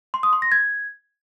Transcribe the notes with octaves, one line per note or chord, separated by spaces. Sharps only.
C6
D#6
C6
A#6
G#6